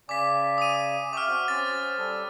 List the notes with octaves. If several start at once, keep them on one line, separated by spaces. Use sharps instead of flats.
C#3 D5 G#5 D6 B6
D#6 D#7
E5 G5 C#6 D6 F6
C4 F#4
C#4 C5 A6
G3 A4